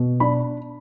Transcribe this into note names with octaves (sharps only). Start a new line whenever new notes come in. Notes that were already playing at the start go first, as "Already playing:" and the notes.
Already playing: B2
D4 B5